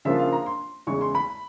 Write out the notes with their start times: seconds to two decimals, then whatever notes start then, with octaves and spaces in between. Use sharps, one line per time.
0.05 C#3 F3 A#3 D4 F4 E5
0.19 F5
0.33 A#5
0.46 C6
0.87 E2 C#3 E3 G#3 C#6
1.01 C6
1.15 B5